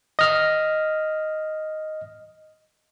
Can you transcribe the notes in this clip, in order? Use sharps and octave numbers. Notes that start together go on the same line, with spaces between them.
D#5 F6